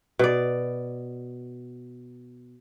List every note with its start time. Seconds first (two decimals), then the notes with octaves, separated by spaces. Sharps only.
0.19 B2 D5